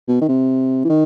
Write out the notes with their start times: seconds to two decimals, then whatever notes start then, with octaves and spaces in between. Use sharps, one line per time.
0.08 B2
0.21 D#3
0.28 C3
0.84 E3
0.89 D#3